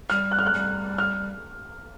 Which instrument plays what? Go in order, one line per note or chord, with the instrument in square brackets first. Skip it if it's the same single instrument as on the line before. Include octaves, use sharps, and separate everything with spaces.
[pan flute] G3 [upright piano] F6
[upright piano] F#6
F6
F#6
[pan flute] G3
[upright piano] F6